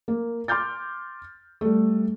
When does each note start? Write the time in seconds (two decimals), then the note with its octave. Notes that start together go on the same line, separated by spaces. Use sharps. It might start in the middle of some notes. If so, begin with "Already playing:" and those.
0.08 A#3
0.48 C6 D6 F6 G6 A6
1.61 G3 A3